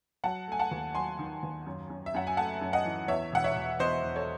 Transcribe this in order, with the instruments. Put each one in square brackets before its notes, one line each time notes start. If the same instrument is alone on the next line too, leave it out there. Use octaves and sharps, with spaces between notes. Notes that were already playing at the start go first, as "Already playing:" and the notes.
[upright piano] F#3 F#5 A5
A3 G#5
F#5 A5
D#2
F#3 G#5 C6
D#3
D#2
F#2
F#2
E5
F#2 F#5
G#5
A3 F#5 A5
F#2
D#5 F#5
E3
E2 C#5 E5
E1 F#5
C#5 E5
E1
E2 C5 D#5
E2
A4 C#5